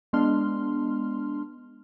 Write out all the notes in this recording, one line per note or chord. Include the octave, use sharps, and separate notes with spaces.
G#3 B3 D4 C6 F6